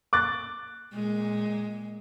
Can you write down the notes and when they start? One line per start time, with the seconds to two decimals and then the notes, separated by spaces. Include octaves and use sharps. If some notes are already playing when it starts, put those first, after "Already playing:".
0.13 D6 F#6 A6
0.93 A#2 G#3